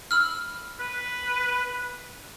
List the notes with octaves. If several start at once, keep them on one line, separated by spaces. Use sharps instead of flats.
B5 E6 F6
B4